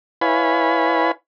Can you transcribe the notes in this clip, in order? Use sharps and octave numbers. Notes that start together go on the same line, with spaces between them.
E4 B4 C#5 F5 G#5 B5